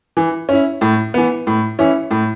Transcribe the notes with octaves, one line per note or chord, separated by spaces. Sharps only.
E3
C#4 E4
A2
E3 B3
A2
E3 C#4 E4
A2